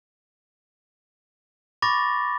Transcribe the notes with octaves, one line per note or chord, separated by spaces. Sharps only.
B5 C#6 D6 A6 A#6